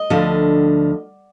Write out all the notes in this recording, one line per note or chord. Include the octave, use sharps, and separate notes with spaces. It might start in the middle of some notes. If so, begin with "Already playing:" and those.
Already playing: D#5
D2 D3 F3